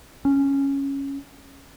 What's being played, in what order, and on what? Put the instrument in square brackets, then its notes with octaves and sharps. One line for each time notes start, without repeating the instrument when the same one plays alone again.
[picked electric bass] C#4